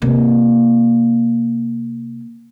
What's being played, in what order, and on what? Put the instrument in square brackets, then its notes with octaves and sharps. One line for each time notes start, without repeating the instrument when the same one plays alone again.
[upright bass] C3 A#3